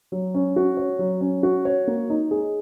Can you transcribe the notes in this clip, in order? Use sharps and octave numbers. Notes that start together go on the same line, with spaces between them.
F#3
C#4
F#4
C#5
F#3
C#4
F#4
C#5
A#3
D#4
G#4